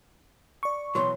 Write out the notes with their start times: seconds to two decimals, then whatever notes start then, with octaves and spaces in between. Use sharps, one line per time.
0.63 D5 C#6
0.95 B2 E3 F#3 C6